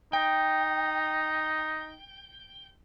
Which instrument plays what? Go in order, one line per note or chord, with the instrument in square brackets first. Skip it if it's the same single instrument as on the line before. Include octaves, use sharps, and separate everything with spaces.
[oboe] D#4 [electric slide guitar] G5